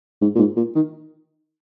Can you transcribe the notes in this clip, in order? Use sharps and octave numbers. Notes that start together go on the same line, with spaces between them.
G#2
A#2
G#2
A#2
D#3